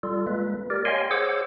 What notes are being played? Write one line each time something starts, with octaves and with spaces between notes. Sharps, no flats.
G3 F4 A4
G#3 A#3 B4
G4 A#4 D5
C#5 D#5 F5 G5 G#5 C6
G#4 C5 C#5 F#5 D6 E6